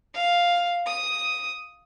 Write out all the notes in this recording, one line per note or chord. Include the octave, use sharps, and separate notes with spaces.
F5
D#6